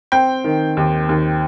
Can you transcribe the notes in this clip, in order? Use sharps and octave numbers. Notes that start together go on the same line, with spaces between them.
C4 G5
D#3
D#2
D#2